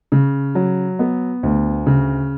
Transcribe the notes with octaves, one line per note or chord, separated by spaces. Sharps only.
C#3
F#3
B3
D2
C#3